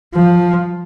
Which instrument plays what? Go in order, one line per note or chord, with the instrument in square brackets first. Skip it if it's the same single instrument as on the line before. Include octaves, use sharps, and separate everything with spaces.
[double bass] F3